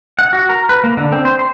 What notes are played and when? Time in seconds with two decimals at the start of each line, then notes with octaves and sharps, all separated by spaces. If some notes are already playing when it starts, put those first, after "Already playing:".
0.19 F#5
0.33 F#4
0.49 A#4
0.69 B4
0.84 A#3
0.97 D3
1.12 C4
1.25 C5
1.39 C6